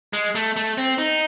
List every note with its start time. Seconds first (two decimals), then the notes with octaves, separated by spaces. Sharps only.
0.13 G#3
0.35 A3
0.56 A3
0.78 C4
0.98 D#4